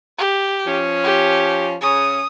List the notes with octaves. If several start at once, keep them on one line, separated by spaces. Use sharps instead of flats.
G4
F3 C#4
G4
C#3 C#4 D#6